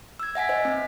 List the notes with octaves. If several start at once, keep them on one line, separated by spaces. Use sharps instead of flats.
E6 G#6
E5 F#5 G#5 B6
C5 D#5
C4